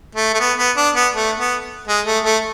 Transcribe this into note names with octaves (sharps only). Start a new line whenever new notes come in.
A3
A3
B3
B3
D4
B3
A3
B3
G#3
A3
A3